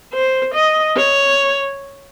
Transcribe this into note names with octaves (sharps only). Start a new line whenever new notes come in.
C5
D#5
C#5